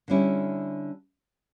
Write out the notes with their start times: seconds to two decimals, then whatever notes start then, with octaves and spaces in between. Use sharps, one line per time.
0.08 D3 G3 C#4 E4